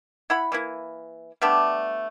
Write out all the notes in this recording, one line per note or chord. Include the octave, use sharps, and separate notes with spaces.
E4 F#5 B5
E3 A#3 E4
G3 A3 B3 D4